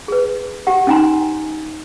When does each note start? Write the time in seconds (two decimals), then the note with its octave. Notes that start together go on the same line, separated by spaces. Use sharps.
0.08 G#4 B4
0.67 G4 F#5
0.87 C#4 D#4 G5 G#5 A#5 C6